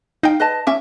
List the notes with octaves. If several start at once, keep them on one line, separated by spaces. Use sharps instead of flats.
D#4 F5 G5
B4 D#5 A5
C#4 E5 D6